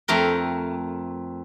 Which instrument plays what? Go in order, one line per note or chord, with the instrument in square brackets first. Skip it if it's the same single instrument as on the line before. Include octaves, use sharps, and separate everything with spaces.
[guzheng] F2 A3 A#4 G5